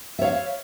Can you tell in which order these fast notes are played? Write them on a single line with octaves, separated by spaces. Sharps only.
E5 C#5 F5